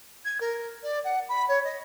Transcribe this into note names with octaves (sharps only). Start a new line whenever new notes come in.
G#6
A#4
D5
F#5
B5
C#5
D#5